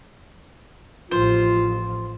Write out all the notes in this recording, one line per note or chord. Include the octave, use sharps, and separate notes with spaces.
A1 F3 F4 C5